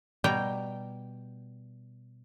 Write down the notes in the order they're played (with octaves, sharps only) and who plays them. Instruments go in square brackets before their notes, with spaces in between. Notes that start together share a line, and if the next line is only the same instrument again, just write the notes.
[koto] B2 G3 G5 A#5